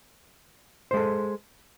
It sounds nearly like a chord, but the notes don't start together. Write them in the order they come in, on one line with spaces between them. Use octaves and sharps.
C5 G#3 A4